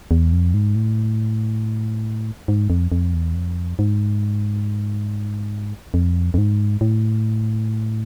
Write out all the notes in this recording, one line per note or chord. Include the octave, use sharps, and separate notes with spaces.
E2
F2
G#2
A2
G#2
F2
F2
E2
F2
G#2
F2
F2
G#2
A2